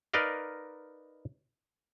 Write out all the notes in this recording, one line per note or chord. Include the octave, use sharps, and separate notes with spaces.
D#4 A#4 B4 D5 D#5 F5